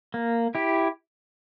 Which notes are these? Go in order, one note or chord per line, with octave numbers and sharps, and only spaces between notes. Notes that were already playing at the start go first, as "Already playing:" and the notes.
A#3
E4 G4